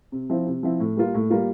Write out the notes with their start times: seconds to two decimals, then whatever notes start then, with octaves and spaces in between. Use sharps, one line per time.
0.12 C3
0.30 F3 C4 E4
0.46 C3
0.63 F3 C4 E4
0.80 A2
0.97 G3 A#3 F4
1.14 A2
1.30 G3 A#3 F4